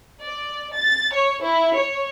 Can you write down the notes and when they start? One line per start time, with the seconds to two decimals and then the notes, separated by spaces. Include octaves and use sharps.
0.22 D5
0.75 A6
1.13 C#5
1.43 E4
1.76 C#5